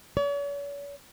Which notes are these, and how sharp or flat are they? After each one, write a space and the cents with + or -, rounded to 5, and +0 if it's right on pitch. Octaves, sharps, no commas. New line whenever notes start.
C#5 +45